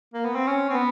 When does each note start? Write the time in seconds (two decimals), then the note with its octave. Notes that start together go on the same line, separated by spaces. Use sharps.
0.14 A#3
0.25 B3
0.36 C4
0.47 C#4
0.70 C4
0.73 B3